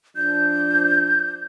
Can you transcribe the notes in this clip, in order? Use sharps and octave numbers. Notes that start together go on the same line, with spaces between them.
F3 D4 G6